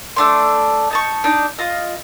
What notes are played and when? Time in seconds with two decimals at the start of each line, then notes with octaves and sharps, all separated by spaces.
0.16 A3 D4 C6
0.91 D#4 A5 C#6
1.24 D4 D#4
1.59 F4 D#5